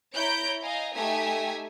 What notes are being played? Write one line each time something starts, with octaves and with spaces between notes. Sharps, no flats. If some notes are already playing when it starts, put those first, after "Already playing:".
E4 C#5 A#5 G6 D7
D#5 F5 G#5 A#5
A3 D#4 G4 E5 G#5 D#6